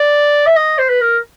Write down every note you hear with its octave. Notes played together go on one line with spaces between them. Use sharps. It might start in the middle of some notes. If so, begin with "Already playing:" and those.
Already playing: D5
E5
D#5
C5
B4
A#4